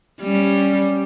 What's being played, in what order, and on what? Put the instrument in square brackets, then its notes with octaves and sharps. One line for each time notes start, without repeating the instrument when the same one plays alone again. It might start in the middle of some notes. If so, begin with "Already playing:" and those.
[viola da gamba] G3 C#4